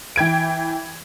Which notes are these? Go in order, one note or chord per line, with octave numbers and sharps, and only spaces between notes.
E3 G5 G#6 D7